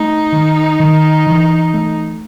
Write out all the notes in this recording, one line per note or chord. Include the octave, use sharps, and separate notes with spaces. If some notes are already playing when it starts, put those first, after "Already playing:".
Already playing: A3 D#4
D#3
D#3
E3
A3